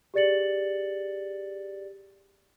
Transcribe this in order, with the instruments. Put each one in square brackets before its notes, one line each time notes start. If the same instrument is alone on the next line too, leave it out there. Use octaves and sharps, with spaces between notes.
[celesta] G4 G#4 D5 A6 C#7 F#7